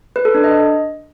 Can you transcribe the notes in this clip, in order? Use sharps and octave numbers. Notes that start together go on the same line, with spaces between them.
B4
A4
D4
D#5